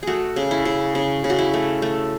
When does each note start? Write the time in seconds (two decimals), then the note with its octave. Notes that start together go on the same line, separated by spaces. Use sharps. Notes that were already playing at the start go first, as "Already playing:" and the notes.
0.03 A3 F#4 G#4
0.36 C#3
0.51 E4
0.65 C#3
0.95 C#3
1.24 C#3
1.30 F#4
1.38 E4
1.54 A3
1.82 A3